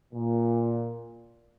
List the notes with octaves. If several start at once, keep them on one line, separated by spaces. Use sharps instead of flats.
A#2